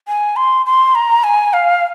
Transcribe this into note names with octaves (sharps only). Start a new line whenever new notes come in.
G#5
C6
C6
A#5
G#5
F5